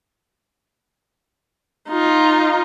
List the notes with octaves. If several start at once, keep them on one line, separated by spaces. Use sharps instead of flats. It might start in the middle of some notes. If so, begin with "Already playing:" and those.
D#4 F4